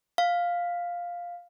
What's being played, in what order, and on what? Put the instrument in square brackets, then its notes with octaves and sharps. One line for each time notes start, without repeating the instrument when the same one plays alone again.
[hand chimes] F5